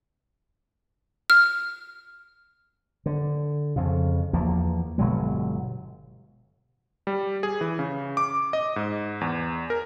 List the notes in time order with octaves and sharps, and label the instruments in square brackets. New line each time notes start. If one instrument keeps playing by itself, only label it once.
[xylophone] F6
[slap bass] D3
F2 C#3
E2 F3 A#3
G1 B2 F#3 G#3
[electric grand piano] G3
G#4
E3
C#3
D6
D#5
G#2
E2
A#4